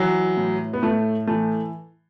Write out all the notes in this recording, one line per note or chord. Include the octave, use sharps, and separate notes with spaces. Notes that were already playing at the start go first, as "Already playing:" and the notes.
Already playing: E3 F#3
A2
B3
A2 A3
E3 A3